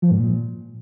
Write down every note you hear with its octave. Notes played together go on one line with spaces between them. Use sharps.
F3
G#2
A#2